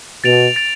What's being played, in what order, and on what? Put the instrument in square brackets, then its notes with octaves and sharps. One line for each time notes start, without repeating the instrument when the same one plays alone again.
[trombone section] B2 [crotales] A6 D7 F7
[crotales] A6 D7 F7